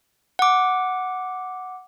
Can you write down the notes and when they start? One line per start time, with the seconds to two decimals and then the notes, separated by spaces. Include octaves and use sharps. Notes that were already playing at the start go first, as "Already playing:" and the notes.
0.39 F#5 D6